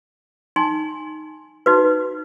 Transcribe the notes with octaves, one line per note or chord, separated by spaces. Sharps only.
D#4 G#5 C6
D#4 F#4 B4